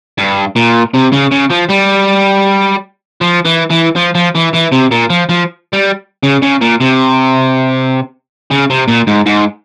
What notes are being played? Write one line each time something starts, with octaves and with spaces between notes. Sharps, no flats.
G2
A#2
C3
C#3
C#3
F3
G3
F3
E3
E3
F3
F3
E3
E3
C3
A#2
F3
F3
G3
C#3
C#3
A#2
C3
C#3
C3
A#2
G#2
G#2